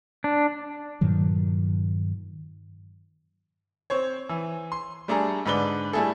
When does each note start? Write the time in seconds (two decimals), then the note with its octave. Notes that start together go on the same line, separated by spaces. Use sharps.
0.24 D4
1.01 G2 A#2 D#3 F#3
3.90 C4 C5 C#5
4.29 E3
4.72 C6
5.08 G3 A3 D4 G#4 A4 A#5
5.45 G#2 D3 B4 D5 G7
5.93 G3 A3 E4 G#4 A4